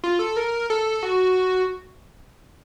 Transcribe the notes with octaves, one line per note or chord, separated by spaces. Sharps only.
F4
A4
A#4
A4
F#4